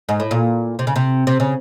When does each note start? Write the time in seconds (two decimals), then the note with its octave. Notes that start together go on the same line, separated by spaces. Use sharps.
0.09 G#2
0.20 A2
0.31 A#2
0.79 C3
0.87 C#3
0.96 C3
1.27 C3
1.40 C#3